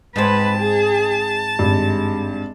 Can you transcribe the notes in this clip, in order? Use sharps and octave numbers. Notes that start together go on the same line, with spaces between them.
G#2 C4 B4 A5
G#4
G#1 G2 G#3